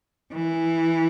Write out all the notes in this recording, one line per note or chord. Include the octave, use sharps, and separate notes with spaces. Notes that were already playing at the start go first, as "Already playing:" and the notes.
E3